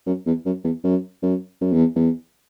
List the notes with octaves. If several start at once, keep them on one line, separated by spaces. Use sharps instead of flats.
F#2
E2
F#2
E2
F#2
F#2
F#2
E2
E2